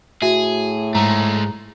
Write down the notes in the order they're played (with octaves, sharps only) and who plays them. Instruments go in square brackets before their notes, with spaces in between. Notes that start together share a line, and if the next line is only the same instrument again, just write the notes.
[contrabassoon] A2 [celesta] F#4 E5 [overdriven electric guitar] G#4
[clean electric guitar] G#2 [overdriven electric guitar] G#3 A3 [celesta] A#5